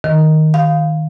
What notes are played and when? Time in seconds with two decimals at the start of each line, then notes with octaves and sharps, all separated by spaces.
0.04 D#3
0.54 F5